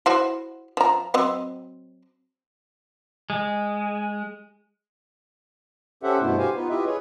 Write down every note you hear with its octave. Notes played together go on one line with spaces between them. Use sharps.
E4 F#4 C5
F3 A#5
F#3 C4 D#5
G#3
C#4 G4 A4 C5 E5 F#5
G2 B2 A3 B3 E4 C5
F#4 G4 C5 F5 G#5
B3 D#4 F4 B4
E4 F4 G4 B4 D#5 E5
G#4 B4 C#5